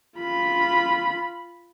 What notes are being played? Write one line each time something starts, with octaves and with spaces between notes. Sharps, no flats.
F4 B5